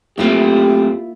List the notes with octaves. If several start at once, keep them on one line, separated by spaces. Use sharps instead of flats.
F#2 A3 A#3 C4 E4 F4 G4